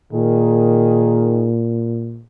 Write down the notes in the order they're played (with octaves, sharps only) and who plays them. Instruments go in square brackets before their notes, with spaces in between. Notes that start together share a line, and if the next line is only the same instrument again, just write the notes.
[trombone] A#2 [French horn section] D#3 G#4